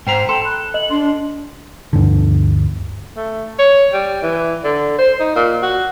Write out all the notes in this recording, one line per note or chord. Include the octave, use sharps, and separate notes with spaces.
G#2 C5 G5 A#5
A4 G5 C6
B5 F#6
D#5 F#7
D4 C6
D2 G2 D3
A3
C#5
G3
E3
D3
C5
D#4
A#2
F#4